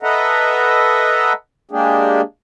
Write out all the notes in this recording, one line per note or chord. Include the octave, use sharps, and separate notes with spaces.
A4 B4 D#5 E5 F#5 A#5
G#3 A#3 D4 G4 G#4